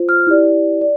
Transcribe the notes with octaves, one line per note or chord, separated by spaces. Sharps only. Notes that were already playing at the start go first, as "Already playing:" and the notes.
Already playing: F4 C5
F6
E4 G4 D5
D5